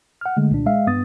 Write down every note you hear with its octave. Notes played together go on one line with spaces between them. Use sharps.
F#5 F6
D3 G#3 A3
C2 A#2 D4
G#3 E5 F5
G2 B3 D#6 A6